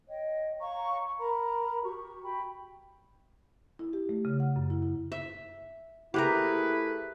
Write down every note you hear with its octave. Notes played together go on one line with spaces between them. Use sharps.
C#5 D#5 G5
C#5 F5 A#5 C#6
A#4 A#5 B5
F#4 G4 C#6
G5 B5
E4
G4
A3
C#3
F#5
F#2
E4
E4
E5
A3 E4 G4 G#4 A#4 B4